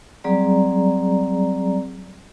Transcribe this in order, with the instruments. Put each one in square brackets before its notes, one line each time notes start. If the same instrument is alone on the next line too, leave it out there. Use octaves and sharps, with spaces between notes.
[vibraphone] F#3 G3 C4 G#4 D5 A#5